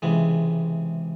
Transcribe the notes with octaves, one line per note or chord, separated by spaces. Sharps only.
C#2 C3 E3 G#3